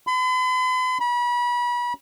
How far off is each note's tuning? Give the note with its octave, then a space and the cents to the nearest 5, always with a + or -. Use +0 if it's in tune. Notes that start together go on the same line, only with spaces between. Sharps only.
B5 +45
B5 -35